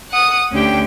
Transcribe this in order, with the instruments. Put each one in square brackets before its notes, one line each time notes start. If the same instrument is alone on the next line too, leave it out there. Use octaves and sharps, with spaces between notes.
[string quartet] F#5 D#6
D2 C#4 D4 G4 G5